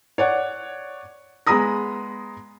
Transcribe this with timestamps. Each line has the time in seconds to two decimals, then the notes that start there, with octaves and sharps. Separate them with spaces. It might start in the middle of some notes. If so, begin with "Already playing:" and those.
0.18 C#5 D5 F#5
1.47 G#3 B3 A#5 B5 D#6 A#6